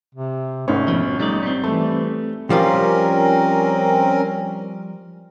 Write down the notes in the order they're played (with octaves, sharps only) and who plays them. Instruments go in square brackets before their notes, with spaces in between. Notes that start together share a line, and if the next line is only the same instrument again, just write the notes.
[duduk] C3
[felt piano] G#1 C#4 [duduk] A3
[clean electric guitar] F2 B2 F3
[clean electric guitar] G3 A3 D5 [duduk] D#4
[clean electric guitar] G3 C4
[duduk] E3 [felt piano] A3
[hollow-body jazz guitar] F3 G3 F4 [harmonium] C4 C#4 A#4